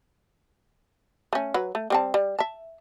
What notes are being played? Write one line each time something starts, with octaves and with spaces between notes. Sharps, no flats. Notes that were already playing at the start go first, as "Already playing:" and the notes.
A3 C#4
F#3 B4
A3
G3 C4 A5
G3
E5 A5